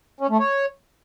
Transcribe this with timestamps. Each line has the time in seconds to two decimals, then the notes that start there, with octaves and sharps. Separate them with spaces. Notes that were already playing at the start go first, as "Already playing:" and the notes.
0.21 C#4
0.30 A3
0.39 C#5